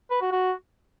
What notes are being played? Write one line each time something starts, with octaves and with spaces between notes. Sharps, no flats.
B4
F#4
F#4